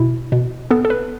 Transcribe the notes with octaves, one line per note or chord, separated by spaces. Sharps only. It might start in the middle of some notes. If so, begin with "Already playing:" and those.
Already playing: B2 E4
B2
B3 A4
A4
B4